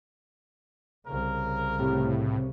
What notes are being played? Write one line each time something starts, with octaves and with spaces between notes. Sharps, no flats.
C2 C#3 A#4
A2 C3